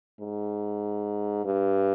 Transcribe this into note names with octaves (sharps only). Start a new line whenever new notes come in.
G#2
G2